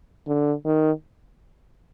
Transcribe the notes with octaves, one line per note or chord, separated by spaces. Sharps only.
D3
D#3